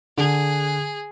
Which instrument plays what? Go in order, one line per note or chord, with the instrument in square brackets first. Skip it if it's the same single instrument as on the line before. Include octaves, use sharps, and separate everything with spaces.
[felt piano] D3 [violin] G#4